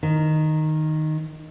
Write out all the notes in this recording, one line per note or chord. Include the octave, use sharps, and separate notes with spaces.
D#3